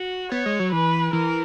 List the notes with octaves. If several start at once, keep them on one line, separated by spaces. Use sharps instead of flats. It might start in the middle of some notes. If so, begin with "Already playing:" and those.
Already playing: F#4
B3 C#5
G#3
F#3
E3 B4
E3 A#4